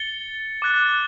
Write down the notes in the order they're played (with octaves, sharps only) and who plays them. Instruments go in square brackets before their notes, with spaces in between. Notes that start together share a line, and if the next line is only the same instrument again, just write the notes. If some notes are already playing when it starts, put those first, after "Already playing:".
Already playing: [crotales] A6 C#7 G7
D6 F#6 A6